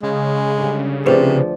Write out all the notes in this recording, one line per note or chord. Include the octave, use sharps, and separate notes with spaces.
C#3 G#3
D3 G3
D2 C3 F3 G#4 B4 C5 D5